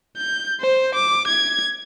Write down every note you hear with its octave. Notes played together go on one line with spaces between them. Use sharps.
G6
C5
D6
G#6